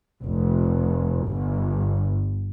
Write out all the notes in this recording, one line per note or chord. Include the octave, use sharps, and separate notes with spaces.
F1
G1